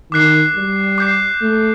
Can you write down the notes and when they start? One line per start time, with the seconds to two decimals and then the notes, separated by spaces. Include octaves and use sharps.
0.12 D#3 D6 F#6 C7
0.55 G3
0.98 D6 G6 C7
1.42 A3